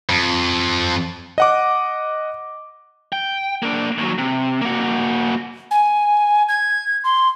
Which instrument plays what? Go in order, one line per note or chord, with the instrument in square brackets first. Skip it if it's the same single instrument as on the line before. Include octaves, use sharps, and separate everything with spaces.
[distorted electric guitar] F2
[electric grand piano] D#5 F#5 D6
[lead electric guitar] G5
A#3 D4
D#2 F#3
C3
A#3 F#4
[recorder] G#5
G#6
C6